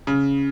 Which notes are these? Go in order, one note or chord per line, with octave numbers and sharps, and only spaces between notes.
C#3